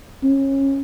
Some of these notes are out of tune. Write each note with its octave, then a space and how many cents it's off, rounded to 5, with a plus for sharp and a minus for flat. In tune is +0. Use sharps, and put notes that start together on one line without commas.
C#4 -25